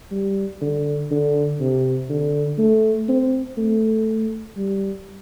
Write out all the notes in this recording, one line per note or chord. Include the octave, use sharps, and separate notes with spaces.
G3
D3
D3
C3
D3
A3
C4
A3
G3